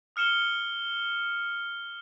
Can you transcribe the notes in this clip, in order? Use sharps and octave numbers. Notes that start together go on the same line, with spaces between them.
D#6 F6 C#7 E7 G7